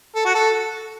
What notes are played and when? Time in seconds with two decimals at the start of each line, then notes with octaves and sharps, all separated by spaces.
0.15 A4
0.25 F#4
0.34 A4